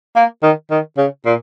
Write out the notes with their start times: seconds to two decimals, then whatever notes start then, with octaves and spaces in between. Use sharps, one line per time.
0.16 A#3
0.43 D#3
0.71 D#3
0.98 C#3
1.25 A#2